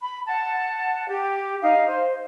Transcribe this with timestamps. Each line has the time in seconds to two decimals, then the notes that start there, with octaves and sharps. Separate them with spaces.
0.01 B5
0.26 F#5 A5
1.06 G4
1.62 D#4 F5
1.88 C5